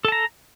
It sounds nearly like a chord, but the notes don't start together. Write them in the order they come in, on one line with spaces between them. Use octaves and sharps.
A4 A5 A#5